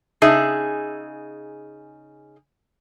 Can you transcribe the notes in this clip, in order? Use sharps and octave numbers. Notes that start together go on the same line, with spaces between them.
C#3 D#4 G#4 E5